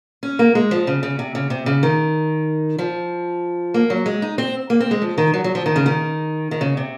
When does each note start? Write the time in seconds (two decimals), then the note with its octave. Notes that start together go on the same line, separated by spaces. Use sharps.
0.23 C#4
0.39 A#3
0.55 G#3
0.71 F3
0.87 C#3
1.03 C#3
1.19 C3
1.35 C#3
1.50 C3
1.66 C#3
1.83 D#3
2.78 F3
3.74 A#3
3.90 F#3
4.06 G#3
4.22 D#4
4.38 C4
4.70 A#3
4.80 C4
4.91 G#3
5.02 F3
5.18 D#3
5.34 F#3
5.44 F#3
5.55 F3
5.66 D#3
5.76 C#3
5.86 D#3
6.51 D#3
6.61 C#3
6.77 C3